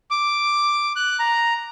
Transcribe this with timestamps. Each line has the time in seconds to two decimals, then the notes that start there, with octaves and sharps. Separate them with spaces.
0.11 D6
0.96 F#6
1.19 A#5